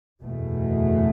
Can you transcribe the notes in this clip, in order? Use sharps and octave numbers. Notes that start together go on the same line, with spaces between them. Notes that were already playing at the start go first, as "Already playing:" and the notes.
F#1 E2 B2 A3